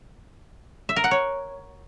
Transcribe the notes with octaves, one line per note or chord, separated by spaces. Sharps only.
E5
A#4
F#5
C#5